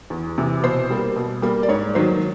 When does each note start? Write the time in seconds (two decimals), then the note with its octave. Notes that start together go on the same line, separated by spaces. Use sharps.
0.10 E2
0.38 C3 E3
0.64 B2 C5
0.90 G3 A#3
1.16 B2
1.42 G3 A#3
1.63 D5
1.69 G#2 C#5
1.95 D#3 F#3 A#3 C5